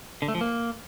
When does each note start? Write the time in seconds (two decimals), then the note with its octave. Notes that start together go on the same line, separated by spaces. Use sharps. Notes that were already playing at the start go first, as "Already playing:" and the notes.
0.22 D3
0.28 A3
0.35 F3
0.41 A#3